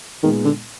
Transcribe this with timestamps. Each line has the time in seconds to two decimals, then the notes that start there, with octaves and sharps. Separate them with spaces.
0.23 A#2 D#3 G#3 B3 D#4
0.45 D3